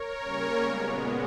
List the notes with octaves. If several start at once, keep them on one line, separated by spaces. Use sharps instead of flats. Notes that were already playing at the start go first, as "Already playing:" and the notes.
Already playing: A#4 C#5
C#3 G3 A#3 C#4
A#2 G#3 B3